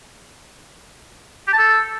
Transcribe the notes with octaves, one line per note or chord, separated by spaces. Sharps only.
G4
A5
A4